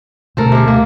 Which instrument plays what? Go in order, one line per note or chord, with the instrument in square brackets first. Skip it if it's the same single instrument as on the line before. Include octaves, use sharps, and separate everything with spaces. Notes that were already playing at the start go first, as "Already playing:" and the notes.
[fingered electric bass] D2 B2 A3 [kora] C4 A4 A#4
[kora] C3 G#3
[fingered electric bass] A3 [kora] A#3